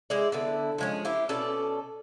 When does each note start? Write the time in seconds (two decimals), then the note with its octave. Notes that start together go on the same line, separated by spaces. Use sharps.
0.10 G#3 E4 D5
0.32 D3 B3 E4
0.78 F3 G#3 C#4
1.05 C4 E4 G4
1.29 B2 C#4 A4 D5